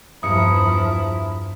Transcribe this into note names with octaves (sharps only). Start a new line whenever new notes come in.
E2 G2 F3 E4 A#5 D#6 C#7